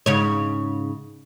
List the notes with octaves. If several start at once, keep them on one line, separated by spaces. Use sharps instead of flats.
G#2 C#3 C#5